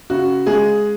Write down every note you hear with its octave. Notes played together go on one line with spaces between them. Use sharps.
C#3 F#4
G#3 G#4